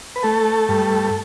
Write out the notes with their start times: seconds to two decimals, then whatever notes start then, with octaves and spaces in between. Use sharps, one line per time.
0.16 B4
0.23 A3 A4
0.69 G2